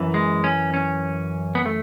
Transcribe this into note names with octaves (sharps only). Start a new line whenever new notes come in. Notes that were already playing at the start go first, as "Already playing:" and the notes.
Already playing: F#2 E3
G#3
C#4
C#4
B3
A3